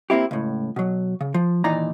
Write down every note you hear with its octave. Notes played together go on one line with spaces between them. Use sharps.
A#3 C4 E4 G4
C#2 A2
B2 F#3
C#3
F3
D#2 A#2 E3 D#4 D5 A#5